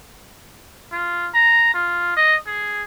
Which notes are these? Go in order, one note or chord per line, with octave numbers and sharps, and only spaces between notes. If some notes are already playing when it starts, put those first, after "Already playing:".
F4
A#5
F4
D#5
G#4